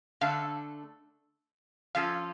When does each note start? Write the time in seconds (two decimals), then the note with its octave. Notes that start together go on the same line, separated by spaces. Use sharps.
0.21 D3 A3 D4 A4 F5
1.95 F3 C#4 F4 A4 F5